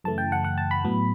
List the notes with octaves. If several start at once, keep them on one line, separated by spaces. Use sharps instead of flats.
F#2 C#3 E3 A3 A5
G5
F#5
F#5
A5
B5
A2 F#3 B3